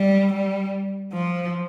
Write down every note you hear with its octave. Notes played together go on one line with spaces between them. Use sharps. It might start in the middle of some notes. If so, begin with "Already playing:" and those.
Already playing: G3
G3
F3